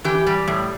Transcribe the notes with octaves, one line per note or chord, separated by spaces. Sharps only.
E3 G4
G3
A2